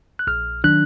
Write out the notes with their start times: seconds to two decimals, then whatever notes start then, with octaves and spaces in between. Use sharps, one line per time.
0.19 F#6
0.27 A#1 F6
0.64 D#3 F#3 D4 F#6